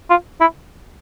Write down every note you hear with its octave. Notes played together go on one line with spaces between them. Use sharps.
F4
E4